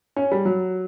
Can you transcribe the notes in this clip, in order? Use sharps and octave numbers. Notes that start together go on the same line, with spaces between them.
C#4
G3
F#3